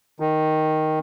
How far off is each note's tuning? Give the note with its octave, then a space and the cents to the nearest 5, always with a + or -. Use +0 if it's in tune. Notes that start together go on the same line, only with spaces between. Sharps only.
D#3 +0